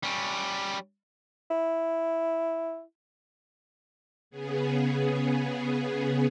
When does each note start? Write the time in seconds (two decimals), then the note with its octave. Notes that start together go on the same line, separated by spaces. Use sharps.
0.03 G3 C#4
1.50 E4
4.30 C#3 B3 G#4